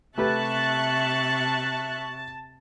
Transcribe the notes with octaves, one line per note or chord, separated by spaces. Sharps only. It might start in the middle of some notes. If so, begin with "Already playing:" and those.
C3 A3 G4 B4 E5 A5 C#6 F#6